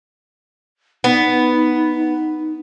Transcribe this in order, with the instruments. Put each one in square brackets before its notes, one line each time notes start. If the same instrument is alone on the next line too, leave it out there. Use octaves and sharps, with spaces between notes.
[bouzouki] B3 [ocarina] D#4